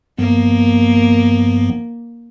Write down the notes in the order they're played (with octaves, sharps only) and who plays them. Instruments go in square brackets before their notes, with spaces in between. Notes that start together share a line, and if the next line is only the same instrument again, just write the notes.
[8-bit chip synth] G2 F3 B3 [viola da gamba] A#3